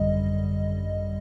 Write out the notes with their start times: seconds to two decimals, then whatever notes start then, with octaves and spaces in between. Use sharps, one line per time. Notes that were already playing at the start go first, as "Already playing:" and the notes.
Already playing: G#1 F#2 D3 G3 D#5